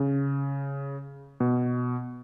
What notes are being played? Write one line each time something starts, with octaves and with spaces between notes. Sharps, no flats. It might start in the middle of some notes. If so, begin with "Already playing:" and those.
Already playing: C#3
B2